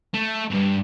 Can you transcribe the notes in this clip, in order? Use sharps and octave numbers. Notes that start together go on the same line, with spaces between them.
A3
D2 G2